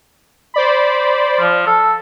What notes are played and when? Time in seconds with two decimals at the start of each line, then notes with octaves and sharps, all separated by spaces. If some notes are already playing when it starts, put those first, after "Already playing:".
0.54 C5 D5 B5
1.41 F3
1.67 A4